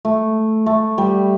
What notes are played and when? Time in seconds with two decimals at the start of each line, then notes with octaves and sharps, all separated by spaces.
0.05 A3
0.66 A3
0.98 G3